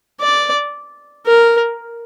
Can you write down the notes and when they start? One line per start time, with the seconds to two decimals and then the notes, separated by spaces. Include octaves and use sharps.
0.20 D5
1.26 A#4